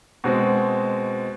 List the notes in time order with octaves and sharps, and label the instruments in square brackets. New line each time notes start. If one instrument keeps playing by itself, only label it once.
[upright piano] B2 G#3 C4 F#4